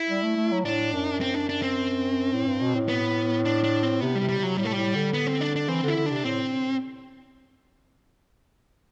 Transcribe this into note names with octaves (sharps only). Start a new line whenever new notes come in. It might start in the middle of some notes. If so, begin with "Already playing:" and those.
Already playing: E4
G3
A3
A3
F#3
A2 D4
F#2
C4
D4
D4
C4
A2
G2
B2
A2
B3
D4
D4
C4
C3 B3
G3
C3
G3
C3 F#3
A2 G3
A3
A2 G3
D3
B3
C4
D4
D4
E3 C4
D3
E4
D3
D4
C3
A2 C4